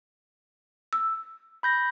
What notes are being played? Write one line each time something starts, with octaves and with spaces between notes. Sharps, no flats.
E6
B5 G6 A#6